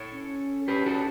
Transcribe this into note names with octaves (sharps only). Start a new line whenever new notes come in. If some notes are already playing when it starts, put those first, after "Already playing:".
Already playing: A4 C#5
C#4
G4 B4
F#4 A4